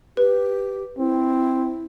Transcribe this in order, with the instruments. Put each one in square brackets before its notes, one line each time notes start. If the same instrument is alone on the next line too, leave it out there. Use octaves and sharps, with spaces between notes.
[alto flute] G4 [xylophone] B4
[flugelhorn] C4 [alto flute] E4